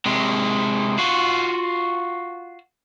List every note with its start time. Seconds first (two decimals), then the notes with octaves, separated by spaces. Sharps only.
0.06 C3 G#3
0.98 F4 F#4